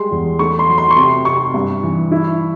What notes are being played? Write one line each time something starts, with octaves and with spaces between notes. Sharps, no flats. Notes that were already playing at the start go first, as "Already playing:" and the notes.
Already playing: G3 G#3 C6
E2
A3 C#6
C6
F#3
C6
C#6
C3 C6
C3 C#6
G2
E3
E4